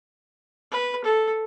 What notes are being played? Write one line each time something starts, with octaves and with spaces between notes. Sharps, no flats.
B4
A4